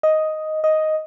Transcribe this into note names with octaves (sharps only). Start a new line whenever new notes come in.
D#5
D#5